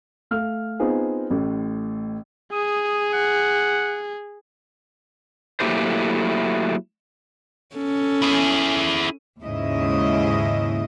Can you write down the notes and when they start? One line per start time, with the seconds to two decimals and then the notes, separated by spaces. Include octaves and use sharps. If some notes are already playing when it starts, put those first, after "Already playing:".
0.31 A3 F5 F6
0.80 B3 C4 D#4 F4 G#4
1.30 A1 A2
2.53 G#4 D#6
3.13 F#5
5.60 F#3 A3 A#3 E4 G4 C5
7.76 C#4 A4
8.22 E4 G#4
9.41 D#2 G#2 C#3 E4 D#5